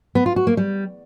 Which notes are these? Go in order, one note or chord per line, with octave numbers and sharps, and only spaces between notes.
B3
F4
F#4
A#3
G3